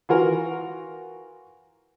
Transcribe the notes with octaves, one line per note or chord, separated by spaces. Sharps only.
E3 F4 F#4 A#4